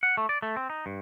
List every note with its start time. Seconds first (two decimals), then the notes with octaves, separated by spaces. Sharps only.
0.03 F#5
0.17 A3
0.29 D5
0.42 A3
0.57 C4
0.70 D#4
0.86 G2